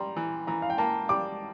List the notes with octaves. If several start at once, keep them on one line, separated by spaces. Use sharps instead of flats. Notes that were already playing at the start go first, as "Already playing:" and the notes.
Already playing: G3 A#5 C6
E3
E3 A#5
F5
G5
A#3 A5
G3 D6